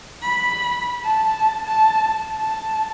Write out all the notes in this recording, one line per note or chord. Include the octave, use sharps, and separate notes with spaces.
B5
A5
A5
A5